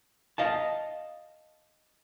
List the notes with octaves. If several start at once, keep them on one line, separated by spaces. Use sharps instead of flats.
D#5 F5 A5